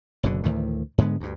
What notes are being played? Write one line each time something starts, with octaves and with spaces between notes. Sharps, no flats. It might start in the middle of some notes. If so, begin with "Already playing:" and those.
F#1 F#2 B2 D3
D2 A2 D#3 E3
G#2 D3 G#3 B3
D2 G2